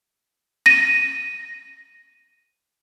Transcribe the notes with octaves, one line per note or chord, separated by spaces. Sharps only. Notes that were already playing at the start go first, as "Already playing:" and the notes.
A#6 D#7